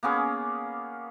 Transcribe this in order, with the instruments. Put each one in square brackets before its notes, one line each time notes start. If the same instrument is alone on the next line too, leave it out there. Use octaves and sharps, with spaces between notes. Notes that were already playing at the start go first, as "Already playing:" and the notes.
[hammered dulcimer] A#3 B3 C#4 G#4